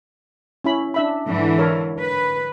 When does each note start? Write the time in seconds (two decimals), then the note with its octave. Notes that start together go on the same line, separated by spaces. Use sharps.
0.64 C#4 E4 B5
0.94 D4 E5 B5
1.26 G#2 D3 E3
1.58 A4 A#4 C#5
2.00 B4